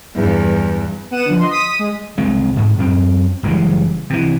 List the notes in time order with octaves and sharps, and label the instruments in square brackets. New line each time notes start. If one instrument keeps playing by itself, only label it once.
[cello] E2 G2
[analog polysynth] B3 F#5 D#7 E7
D3 F3
D#5 C6
D#6 B6 D#7
G#3
[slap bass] C2 G#3 A3 C4
G#2
F#2 C4
F#1 E3 G3 G#3
C3 E3